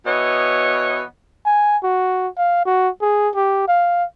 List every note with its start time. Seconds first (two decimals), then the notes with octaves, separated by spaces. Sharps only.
0.05 B2 E3 B3 C#5 D#5
1.45 G#5
1.84 F#4
2.37 F5
2.66 F#4
3.01 G#4
3.35 G4
3.68 F5